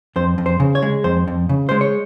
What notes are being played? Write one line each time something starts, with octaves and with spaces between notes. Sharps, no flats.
F2 C5
F2
C5
C#3
C#5
G#3
F2 C5
F2
C#3
G#3 C5
C#5